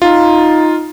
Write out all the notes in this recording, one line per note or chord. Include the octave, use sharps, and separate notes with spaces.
D#4 F4